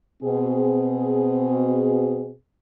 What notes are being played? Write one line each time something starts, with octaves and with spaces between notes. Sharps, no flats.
B2 C4 G#4